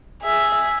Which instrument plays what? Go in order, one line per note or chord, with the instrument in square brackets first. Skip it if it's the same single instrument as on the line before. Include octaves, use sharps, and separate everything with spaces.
[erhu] G#4 [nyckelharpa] E5